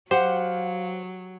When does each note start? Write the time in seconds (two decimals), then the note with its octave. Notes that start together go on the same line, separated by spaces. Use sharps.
0.11 F#3 G4 C5 F5 F#5